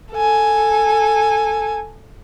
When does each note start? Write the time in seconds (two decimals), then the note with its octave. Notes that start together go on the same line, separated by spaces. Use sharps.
0.13 A4 G#5